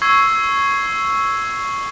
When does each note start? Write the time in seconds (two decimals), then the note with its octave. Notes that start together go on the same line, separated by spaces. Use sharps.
0.02 C#6 E6 G#6 C7